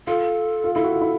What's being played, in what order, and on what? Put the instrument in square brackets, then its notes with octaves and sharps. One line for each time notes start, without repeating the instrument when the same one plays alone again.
[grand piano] F4 [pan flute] A4
[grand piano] F4
[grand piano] E4 [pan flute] A4
[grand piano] F#4
F4
E4